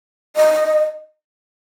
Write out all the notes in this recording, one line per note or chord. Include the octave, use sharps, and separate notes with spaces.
D#5